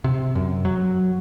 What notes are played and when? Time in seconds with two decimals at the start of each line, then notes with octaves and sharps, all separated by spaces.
0.04 C3
0.35 F#2
0.65 F#3